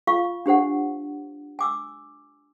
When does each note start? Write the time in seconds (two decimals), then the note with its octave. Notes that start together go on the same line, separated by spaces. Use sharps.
0.07 F4 F5 C#6
0.46 D4 G4 C5 F#5
1.59 G#5 D6 E6